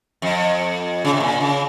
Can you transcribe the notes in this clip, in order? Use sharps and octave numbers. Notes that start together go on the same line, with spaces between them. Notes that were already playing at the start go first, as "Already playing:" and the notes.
F2
C#3
C3
A#2
C#3